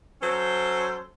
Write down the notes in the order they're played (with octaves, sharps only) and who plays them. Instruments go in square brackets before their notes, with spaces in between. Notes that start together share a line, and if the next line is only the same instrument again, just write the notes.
[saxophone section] F#3 C#4 A4 C5